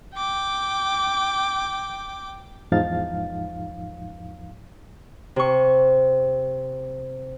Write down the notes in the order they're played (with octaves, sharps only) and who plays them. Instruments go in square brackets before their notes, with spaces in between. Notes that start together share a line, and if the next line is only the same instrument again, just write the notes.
[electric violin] G5 D6
[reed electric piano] E2 G#2 F3 D#4 F5 A6
[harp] C3 C#6